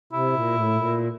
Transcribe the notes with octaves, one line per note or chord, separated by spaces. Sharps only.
C3 E4
A#2
A2
A#2